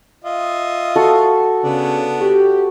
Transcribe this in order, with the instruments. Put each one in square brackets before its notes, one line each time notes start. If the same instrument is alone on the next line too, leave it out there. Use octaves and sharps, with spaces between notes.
[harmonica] F4 D#5 E5
[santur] F#4 A4 F#5
[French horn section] C#3 [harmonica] B3 D4
[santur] F#4 [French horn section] G4